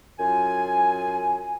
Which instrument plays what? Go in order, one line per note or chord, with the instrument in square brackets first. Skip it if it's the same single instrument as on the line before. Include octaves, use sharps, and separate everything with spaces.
[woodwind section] F#2 F4 G#5